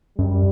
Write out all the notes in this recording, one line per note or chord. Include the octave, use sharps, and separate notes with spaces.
F#2 G3